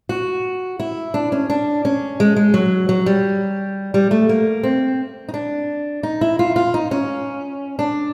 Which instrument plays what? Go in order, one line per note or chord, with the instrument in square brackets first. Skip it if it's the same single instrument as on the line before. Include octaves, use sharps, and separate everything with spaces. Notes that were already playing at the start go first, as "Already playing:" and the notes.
[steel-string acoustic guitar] F#4
E4
D4
C#4
D4
C#4
G#3
G#3
F#3
F#3
G3
G3
A3
A#3
C4
D#4
D4
D#4
E4
F4
F4
D#4
C#4
D4